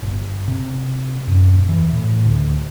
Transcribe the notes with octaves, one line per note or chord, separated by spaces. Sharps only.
G1
C3
F#2
D#1
E3
A2
D2